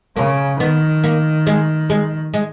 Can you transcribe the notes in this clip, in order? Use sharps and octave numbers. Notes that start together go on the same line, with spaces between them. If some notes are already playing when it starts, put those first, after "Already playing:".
C#3 A#3
D#3 B3
A#3
G#3
G#3
G#3